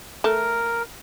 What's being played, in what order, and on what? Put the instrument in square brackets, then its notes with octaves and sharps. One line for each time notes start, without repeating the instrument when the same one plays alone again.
[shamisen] A3 [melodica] A#4